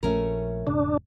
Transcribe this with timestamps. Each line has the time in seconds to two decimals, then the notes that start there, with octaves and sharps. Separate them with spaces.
0.03 A#1 F3 A3 C#4 A#4
0.67 E1 G#2 C#3 D4